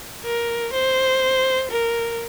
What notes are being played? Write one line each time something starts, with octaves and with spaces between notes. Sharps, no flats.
A#4
C5
A#4